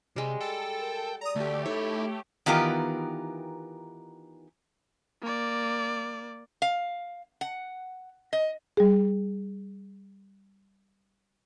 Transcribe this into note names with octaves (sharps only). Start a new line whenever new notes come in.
C3 G3 G#3
A4 G5
A#4
D5 A#5 D#6
D2 A3 G4
D#4 E4 A4 C#5
D#3 E3 B3 F4 G4 A#4
A#3 D5
F5
F#5
D#5
G3 G#4